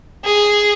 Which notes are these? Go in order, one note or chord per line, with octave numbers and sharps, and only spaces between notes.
G#4